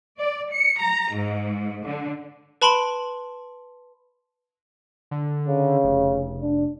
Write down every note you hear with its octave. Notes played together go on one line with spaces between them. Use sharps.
D5
C#7
A#5
G#2
D3
B4 A5 B5 C6 D7 F#7
D3
C#3
F1
D4